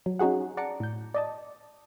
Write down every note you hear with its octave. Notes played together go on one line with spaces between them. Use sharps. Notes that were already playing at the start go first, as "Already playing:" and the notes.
F#3
C#4 D#4 F#4 G#4 F#5
D5 F#5 A5 A#5 D6 C#7
A2 G6
D5 D#5 A5